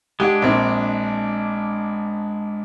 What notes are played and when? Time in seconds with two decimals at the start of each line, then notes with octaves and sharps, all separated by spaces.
0.20 G#3 D4 G4 F#5
0.42 A#1 C4